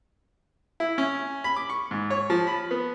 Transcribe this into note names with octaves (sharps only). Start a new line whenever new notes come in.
E4
C#4
B5
D6
C#6
G#2
C#5
F3
B5
B3